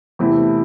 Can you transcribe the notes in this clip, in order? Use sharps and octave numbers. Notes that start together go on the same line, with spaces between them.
E2 C3 E3 A3 E4